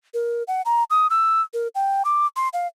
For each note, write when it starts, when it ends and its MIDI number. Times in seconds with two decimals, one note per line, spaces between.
0.14 0.43 70
0.48 0.62 78
0.65 0.84 82
0.90 1.07 87
1.10 1.41 88
1.54 1.68 70
1.75 2.02 79
2.05 2.26 86
2.36 2.49 84
2.53 2.67 77